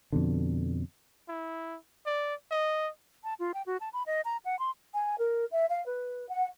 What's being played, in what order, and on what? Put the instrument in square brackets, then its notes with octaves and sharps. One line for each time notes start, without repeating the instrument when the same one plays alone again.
[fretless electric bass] F2 B2 D3
[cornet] E4
D5
D#5
[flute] A5
F4
G5
F#4
A5
B5
D#5
A#5
F#5
C6
[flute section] G#5
A#4
E5
F5
B4
F#5